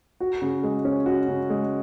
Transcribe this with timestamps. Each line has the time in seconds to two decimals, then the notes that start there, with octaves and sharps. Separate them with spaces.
0.20 F#4
0.42 C#3
0.63 G#3
0.85 C#4
1.06 F#4
1.28 C#3
1.50 G#3